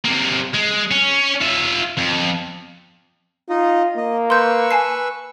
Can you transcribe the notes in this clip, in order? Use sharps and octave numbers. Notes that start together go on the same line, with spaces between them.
C3 A#3
G#3
C#4
F4 E5
F2
D#4 F4 D#5
A#3 D#5
B4 C6 C#6 E6 G6
G#5 A5 C7